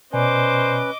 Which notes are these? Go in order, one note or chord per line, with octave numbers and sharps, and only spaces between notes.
B2 C#4 B4 C5 D5 D#5 G#5 D6